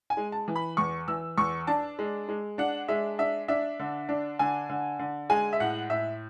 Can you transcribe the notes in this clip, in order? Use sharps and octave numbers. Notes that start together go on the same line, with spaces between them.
G#5
G#3
A5
E3
B5
E2 C#6
E3 E6
E2 C#6
D4 A5
G#3
G#3
D4 F#5
G#3 E5
D4 E5
D4 E5
D3
D4
D3 G#5
D3
D3
G#3 G#5
E5
A2 F#5
A2 E5